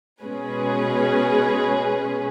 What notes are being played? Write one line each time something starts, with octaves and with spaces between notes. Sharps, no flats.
B2 G#3 C#4 G#4 B4